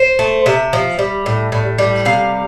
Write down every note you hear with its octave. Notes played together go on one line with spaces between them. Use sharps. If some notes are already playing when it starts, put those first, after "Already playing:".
Already playing: C5
A3
C3 E5
F3
G3
A2
A2
G3
C3 F5